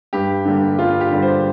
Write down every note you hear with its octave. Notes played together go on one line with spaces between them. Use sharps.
G2 G4
D3 G3 A#3
G2 F4
G4
D3 G3 A#3
C5